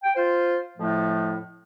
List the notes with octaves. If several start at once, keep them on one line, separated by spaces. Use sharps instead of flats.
G5
F4 C5
F2 A2 F3 A3